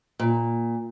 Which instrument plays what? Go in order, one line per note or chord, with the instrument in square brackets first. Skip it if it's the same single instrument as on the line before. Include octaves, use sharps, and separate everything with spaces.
[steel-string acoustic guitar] A#2